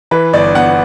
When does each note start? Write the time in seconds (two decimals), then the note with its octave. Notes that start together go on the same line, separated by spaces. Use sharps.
0.11 E3 B4
0.33 G1 D5
0.55 B3 F#5